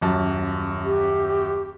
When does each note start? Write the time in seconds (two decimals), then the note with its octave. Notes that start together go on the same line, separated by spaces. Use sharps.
0.01 D#1 F#2 A5
0.84 G4